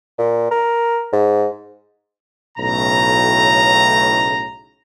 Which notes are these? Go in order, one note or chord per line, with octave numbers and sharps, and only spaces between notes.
A#2
A#4
G#2
B1 A2 C#3 A#5